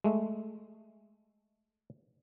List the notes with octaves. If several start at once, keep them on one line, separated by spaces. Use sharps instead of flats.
G#3 A3